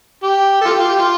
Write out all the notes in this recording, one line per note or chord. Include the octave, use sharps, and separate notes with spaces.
G4
F4 A4
G4
F4
G4
F4